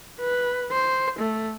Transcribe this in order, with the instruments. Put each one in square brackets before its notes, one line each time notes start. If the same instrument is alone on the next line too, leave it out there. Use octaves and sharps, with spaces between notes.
[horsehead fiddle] B4
C5
A3